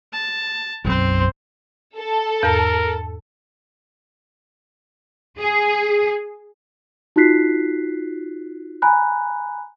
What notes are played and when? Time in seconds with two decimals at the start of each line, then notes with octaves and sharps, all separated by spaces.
0.13 A5
0.85 B1 F#2 C4 C5
1.98 A4
2.43 E2 G#2 A#4 A#5
5.39 G#4
7.16 D#4 F4 F#4 F#6 B6 C7
8.82 G#5 A#5 B5 F#6